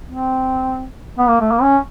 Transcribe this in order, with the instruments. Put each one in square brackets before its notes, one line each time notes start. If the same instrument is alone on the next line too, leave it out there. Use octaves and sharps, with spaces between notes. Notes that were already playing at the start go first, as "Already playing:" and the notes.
[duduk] C4
B3
A#3
A3
A#3
C#4